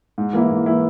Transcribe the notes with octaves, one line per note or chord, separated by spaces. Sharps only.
G#2
E3 A#3 E4
G#2
E3 A#3 E4